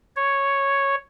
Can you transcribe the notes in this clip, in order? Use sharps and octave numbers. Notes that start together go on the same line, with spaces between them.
C#5